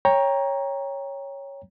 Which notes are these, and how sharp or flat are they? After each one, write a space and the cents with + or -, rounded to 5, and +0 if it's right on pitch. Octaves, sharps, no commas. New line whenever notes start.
C#5 +0 G5 +15 A#5 +10